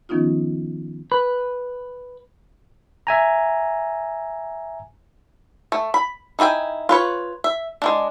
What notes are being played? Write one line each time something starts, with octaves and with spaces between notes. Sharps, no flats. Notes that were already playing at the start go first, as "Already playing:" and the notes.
D#3 F3 B3 C#4 D#4 F4
B4
E5 G#5 A#5
A3
B5
D#4 E4 G#4 G5 G#5
F4 B4 C#5
E5
G#3 A#3 D4